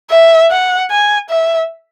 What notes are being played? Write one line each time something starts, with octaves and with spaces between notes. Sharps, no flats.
E5
F#5
G#5
E5